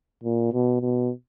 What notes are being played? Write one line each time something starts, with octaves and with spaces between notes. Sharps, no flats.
A#2
B2
B2